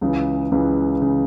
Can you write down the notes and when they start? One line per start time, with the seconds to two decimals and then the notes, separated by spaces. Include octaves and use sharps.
0.01 C#2 C#3 E3
0.52 C#2 C#3 E3
1.02 C#3 E3